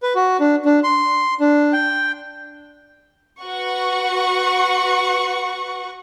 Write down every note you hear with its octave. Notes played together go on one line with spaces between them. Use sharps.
B4
F#4
D4
D4
C6
D4
G5
F#4 B4 F#5 C#6